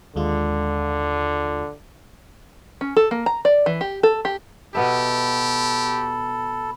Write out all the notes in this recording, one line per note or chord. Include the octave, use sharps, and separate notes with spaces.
D#2 D3 G#3 F4
C#4
A4
A#3
A#5
D5
E3
G4
A4
G4
B2 B3 G4 A4 E5 B5